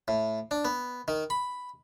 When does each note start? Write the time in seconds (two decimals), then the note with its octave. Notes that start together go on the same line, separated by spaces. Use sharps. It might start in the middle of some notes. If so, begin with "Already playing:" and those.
0.08 A2
0.51 D4
0.65 B3
1.08 D#3
1.30 B5